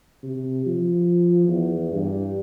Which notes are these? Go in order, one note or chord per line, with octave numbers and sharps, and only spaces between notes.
C3
F3
E2
G2